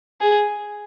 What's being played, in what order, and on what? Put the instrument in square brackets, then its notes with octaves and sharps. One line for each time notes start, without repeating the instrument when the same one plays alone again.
[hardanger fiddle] G#4